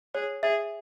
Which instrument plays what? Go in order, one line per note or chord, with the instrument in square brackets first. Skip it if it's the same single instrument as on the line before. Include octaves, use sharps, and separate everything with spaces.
[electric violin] G#4 [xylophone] C#5
[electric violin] G#4 [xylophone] E5